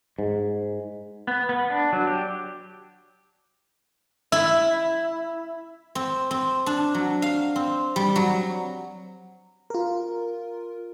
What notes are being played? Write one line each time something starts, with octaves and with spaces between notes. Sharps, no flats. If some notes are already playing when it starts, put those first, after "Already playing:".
G#2
B3
B3
D4
F#3
G4
E4
C4
C4
D4
F#3
F5
C4
G3
F#3
F4 A#4